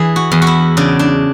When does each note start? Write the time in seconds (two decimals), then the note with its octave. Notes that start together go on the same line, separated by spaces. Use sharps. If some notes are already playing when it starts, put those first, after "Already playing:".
Already playing: E3 G#4
0.16 F#4
0.32 E2
0.42 F#4
0.47 E4
0.77 C#3 D4
0.99 D4